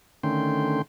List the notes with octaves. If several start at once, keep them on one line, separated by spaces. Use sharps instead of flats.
D3 D#3 A3 C#4 G5 C6